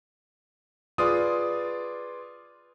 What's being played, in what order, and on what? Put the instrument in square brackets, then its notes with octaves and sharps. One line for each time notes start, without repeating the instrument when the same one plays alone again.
[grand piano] F4 G#4 B4 D5 C6 D#6